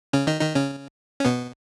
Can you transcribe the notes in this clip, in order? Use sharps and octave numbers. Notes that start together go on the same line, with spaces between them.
C#3 C#4
D#3 D#4
D#3 D#4
C#3 C#4
C#4
B2 B3